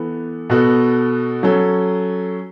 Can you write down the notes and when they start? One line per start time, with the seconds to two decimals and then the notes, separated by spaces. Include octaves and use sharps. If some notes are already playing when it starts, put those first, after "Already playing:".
Already playing: E3 B3 A4
0.50 B2 B3 F#4 A4
1.43 F#3 C#4 A4